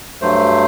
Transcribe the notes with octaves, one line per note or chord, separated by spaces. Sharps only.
G2 F#3 A3 C5